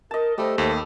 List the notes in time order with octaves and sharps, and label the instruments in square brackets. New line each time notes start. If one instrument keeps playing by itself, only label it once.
[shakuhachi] A#4 [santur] D#5 A5
[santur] G3 A4 [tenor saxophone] A3 [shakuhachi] C5
[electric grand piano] D#2 [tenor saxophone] A3